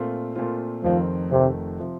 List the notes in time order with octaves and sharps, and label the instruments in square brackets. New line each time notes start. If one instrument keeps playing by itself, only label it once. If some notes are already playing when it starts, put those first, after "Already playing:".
Already playing: [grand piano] A#2 A3 C4 F4
A#2 A3 C4 F4
[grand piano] F1 F2 D#3 A3 C4 [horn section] F3
[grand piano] F1 F2 D#3 A3 C4 [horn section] C3
[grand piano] C3 F3 C4